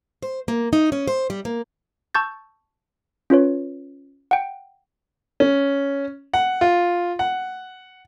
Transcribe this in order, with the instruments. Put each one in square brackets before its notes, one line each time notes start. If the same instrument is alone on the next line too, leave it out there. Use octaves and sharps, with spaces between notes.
[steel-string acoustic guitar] C5
A#3
D#4
C#4
C5
G3
A#3
[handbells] A5 C#6 E6 G6 A6
C#4 F4 B4 C#5
F#5 G5
[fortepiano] C#4
F#5
F4
F#5